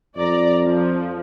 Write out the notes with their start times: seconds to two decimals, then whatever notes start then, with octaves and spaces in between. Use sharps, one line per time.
0.17 F2 D5 A#5
0.66 F3